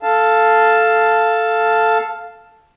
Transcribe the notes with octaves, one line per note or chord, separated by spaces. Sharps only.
A4 F5 A5